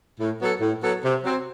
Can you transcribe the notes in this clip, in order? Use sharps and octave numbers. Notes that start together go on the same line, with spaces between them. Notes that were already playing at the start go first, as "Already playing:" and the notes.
A2
F#3 B3 F#4 A4
A2
F#3 B3 F#4 A4
C3
F#3 C4